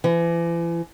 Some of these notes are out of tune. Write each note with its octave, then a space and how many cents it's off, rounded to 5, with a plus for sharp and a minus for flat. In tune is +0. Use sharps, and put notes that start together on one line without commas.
E3 +40